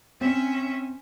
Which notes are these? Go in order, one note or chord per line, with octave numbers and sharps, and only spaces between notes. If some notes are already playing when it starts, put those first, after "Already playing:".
C4 C#4 E5